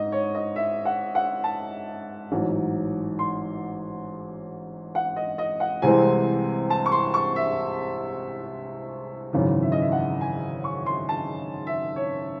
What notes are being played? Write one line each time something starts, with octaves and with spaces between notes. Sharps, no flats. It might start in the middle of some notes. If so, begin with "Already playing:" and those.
Already playing: G#2 D#5
C#5
D#5
E5
F#5
F#5
A5
A1 G#2 F#3
C6
F#5
D#5
D#5
F#5
C2 C3 E3 G#3 C4 G#5
A5
C#6
C6
C#6
E5
G#1 F#2 C#3 E3
E5
D#5
E5
F#5
G#5
C#6
C6
A5
E5
C#5